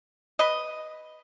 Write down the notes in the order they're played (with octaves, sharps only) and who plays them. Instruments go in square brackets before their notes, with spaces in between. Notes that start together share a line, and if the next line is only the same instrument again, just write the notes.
[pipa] B4 D#5